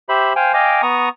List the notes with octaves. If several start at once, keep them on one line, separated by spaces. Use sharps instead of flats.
G4 C5 E5 B5
C5 F5 G5 G#5
D#5 F5 G5 G#5 D6
B3 A#5 C#6 D#6